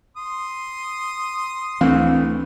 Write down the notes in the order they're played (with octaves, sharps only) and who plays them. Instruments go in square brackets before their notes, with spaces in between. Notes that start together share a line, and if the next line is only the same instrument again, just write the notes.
[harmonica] C6 D#6
[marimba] D2 [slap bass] E3 A3 [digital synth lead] C4